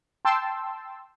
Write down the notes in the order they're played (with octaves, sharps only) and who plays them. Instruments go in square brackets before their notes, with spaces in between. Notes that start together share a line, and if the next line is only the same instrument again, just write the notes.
[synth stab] G5 A5 C6 E6